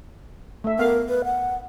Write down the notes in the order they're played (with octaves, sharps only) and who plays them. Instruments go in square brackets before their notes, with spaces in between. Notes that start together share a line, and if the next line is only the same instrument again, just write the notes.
[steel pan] A3 E5
[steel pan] B3 F5 [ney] A#4
[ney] B4
F#5